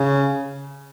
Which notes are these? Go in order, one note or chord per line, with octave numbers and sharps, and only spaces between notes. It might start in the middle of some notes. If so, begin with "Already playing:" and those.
Already playing: C#3